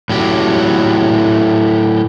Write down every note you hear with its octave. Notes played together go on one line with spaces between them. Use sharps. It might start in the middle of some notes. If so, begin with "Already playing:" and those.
A2 F#3 G4